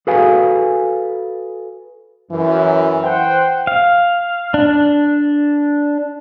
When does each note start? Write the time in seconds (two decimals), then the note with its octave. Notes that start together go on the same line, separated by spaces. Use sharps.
0.07 F#4 G#4 A4 B4 F5 G#5
2.31 F#2 E3
3.02 C5 F#5 G5
3.67 F5
4.54 D4